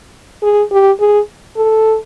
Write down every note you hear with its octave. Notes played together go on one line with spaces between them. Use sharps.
G#4
G4
G#4
A4